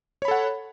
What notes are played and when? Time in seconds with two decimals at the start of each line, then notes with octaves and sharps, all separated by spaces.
0.22 C#5
0.25 B5
0.28 A4
0.31 F#5